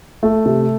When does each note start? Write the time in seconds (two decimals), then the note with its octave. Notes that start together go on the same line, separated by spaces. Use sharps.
0.23 A3
0.46 C3